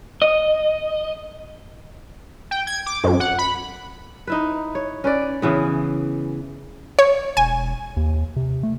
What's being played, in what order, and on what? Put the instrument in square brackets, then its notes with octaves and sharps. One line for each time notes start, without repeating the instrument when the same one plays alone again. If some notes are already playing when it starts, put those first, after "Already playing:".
[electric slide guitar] D#5
[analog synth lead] G5
G#6
D6
F#2
F#5
B5
[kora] D#4 E4 B4
C#5
C#4 B4 D5
C#3 E3 B3
[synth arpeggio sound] C#5
[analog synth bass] E1 [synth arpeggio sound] G#5
[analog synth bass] D#2
C3
A3